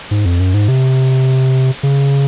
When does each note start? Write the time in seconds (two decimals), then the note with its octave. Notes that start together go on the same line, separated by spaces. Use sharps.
0.11 G#2
0.25 F2
0.40 F#2
0.54 G#2
0.68 C3
1.83 C#3